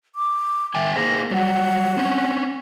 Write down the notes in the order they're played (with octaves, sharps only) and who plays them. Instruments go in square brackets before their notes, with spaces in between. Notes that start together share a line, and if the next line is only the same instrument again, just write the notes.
[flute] D6
[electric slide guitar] D#3 G5 G#5 [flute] E5
[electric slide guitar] A#3 G#4 C5 [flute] A#6
[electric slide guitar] F#3 G3 [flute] F#5
[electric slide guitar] C4 C#4